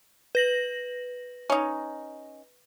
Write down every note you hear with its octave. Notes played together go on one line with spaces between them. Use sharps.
B4 A#6 F#7
C#4 D#4